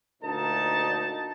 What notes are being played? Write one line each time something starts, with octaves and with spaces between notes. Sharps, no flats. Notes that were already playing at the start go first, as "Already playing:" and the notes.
D2 A#2 D#4 A#4 A5